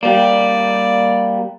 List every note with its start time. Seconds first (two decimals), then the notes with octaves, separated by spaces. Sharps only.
0.03 G3 A#3 D5